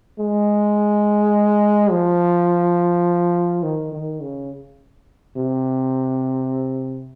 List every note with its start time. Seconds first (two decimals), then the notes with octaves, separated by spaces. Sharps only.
0.19 G#3
1.91 F3
3.63 D#3
3.93 D#3
4.21 C#3
5.37 C3